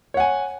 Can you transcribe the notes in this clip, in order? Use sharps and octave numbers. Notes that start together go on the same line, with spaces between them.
C#5 F#5 G#5